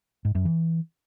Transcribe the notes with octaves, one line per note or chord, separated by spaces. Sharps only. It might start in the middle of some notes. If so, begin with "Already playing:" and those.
G#2
F#2
E3